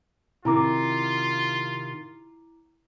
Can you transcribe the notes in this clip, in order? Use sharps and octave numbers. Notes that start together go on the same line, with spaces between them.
C3 D#3 E4 F4 A#5 D6